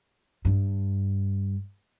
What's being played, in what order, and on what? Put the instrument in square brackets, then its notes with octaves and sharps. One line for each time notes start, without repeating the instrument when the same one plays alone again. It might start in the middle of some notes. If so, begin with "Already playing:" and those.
[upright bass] G2 D4